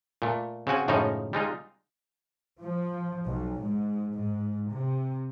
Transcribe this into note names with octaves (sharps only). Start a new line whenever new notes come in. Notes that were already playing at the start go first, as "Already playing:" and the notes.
A#2 A3
C#3 C4 F#4 G#5
F#2 A2 C#3 F3 G#3 D#4
G3 G#3 D#4 F4
F3
B1
G#2
G#2
C3